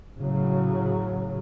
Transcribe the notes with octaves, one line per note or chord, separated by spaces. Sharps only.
A2 C#3 F#3